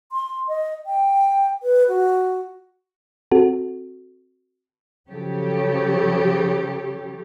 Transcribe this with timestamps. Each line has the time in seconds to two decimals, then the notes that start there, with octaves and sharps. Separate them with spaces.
0.12 C6
0.48 D#5
0.86 G5
1.63 B4
1.89 F#4
3.32 C4 F#4 A4
5.10 C#3 F3 F#3 G4 A4 C#5